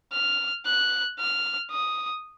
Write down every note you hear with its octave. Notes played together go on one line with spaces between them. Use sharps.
F6
F#6
F6
D#6